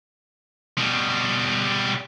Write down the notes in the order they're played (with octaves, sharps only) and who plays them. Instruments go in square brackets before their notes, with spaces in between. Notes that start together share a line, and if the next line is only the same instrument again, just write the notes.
[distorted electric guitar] B2 G3